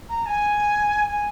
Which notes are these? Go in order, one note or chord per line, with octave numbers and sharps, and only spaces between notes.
A#5
G#5
G#5